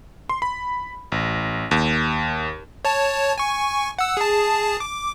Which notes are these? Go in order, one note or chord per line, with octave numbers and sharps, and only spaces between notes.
C6
B5
A1
D#2
C#5 A5
G#5 C#6
F#5 E6
G#4 A5
D6